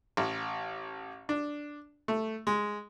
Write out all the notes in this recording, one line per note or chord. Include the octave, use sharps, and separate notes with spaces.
A1
D4
A3
G#3